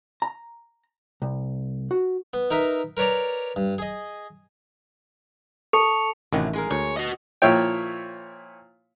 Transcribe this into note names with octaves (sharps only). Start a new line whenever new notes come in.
A#5
C2
F#4
B3
D#4 A#4 B4 E5
A#4 B4 C#5 D5 A#5
G2
G#4 D#5
A4 A5 C#6 C#7 F7
A1 A2 C3 D#3 F#3
G#3 G#4 A#4
D2 C#5
F#4 D#5
A#2 F3 E4 C#5 G5